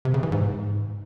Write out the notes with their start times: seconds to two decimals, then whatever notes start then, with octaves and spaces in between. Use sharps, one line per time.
0.05 C3
0.14 C#3
0.23 E3
0.32 G#2